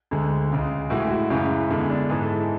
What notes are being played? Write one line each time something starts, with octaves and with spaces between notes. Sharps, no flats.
D2 D3 G#3
C#2 C#3 G#3
A2 E3 G#3 F#4
F#4
F#2 C#3 E3 G#3
E2 D3 G#3
D4
G#2 E3 G#3 G#4
A4